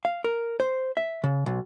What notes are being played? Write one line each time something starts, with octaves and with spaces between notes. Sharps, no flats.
F5
A#4
C5
E5
C#3
B1